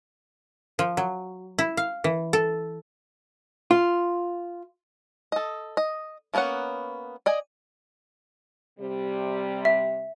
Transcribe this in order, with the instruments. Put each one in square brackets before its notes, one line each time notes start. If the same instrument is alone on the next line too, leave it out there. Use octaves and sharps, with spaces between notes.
[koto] F3
F#3
E4
F5
E3
A4
[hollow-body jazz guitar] F4
[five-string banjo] A4 D#5
D#5
F3 A#3 B3 C#4 F#5
D5 D#5 G#5
[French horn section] C3 G3
[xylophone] E5